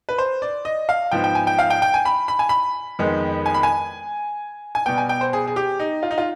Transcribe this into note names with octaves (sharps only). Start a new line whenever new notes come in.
B4
C5
D5
D#5
F5
G#2 F3 B3 G5
G5
G#5
G5
F5
G5
G5
G#5
B5
B5
G#5
B5
F2 D#3 G#3 B3
G#5
B5
G#5
G#5
B2 G3 B3 G5
G#5
G5
C5
G#4
G#4
G4
D#4
F4
D#4
F4